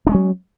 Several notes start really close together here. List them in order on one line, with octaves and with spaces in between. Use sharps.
D4 G#3 C#4 F#3